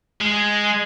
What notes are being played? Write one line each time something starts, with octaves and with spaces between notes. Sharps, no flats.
G#3